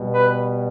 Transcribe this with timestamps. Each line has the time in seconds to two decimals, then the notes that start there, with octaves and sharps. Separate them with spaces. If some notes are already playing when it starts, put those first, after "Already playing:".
Already playing: B2 G3
0.13 B4